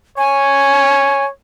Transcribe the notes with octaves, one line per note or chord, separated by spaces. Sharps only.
C#5 G#5